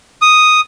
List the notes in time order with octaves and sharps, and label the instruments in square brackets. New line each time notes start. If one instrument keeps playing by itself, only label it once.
[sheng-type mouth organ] D#6